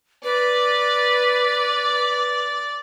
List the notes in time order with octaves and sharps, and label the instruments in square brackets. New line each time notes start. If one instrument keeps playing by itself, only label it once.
[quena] B4 [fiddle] D5